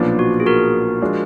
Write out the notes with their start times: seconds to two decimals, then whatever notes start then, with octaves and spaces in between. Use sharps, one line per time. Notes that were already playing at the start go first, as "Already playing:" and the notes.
Already playing: B1 A#2 F3 B3 D4
0.19 F#4
0.40 G#4
0.46 F#4 A#4
1.02 F3 G#3 D4